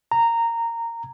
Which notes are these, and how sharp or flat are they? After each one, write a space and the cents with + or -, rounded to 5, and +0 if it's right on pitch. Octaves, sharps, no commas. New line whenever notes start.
A#5 -15